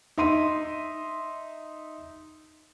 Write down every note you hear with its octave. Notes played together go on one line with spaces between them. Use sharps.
D#4 E5 C6 D#7